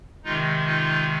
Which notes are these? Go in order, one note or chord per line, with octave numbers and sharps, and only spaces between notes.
C3 D#3 G#3 D#4 F4
D#4 F4